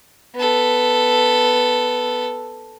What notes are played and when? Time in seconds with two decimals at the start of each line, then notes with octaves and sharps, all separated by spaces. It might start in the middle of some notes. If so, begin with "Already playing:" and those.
0.36 B3 A4